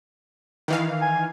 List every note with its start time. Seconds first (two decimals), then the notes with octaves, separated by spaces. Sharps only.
0.68 D#3 E3 F5
1.01 G#5